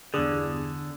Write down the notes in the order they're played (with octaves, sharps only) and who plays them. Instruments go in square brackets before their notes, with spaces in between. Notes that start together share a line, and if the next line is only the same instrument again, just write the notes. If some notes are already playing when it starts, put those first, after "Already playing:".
[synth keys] E2 G2 G#4 [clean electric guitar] D3